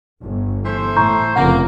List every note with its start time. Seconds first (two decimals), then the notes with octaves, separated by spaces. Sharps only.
0.23 G1
0.65 E3 A3 C5
0.97 A2 A#5 C#6 G6
1.36 F1 C#3 A#3 F#5